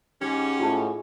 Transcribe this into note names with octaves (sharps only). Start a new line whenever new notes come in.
G#2 C#4 G4
A2 F4 G4 A5